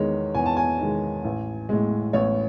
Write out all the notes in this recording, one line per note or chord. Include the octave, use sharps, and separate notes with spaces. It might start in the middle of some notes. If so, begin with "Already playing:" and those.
Already playing: E2 D#3 G#3 C#5
E2 G#5
A5
G#5
D#3 G#3
A1
A2 G#3
A1 C#5